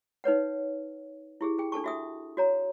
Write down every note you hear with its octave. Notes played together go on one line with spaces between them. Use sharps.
D#4 B4 C#5 F#5
E4 G4 G#4
G#4 G5
D4 A4 A5 C#6
F#4 E5 D#6
F#4 C#5 A#5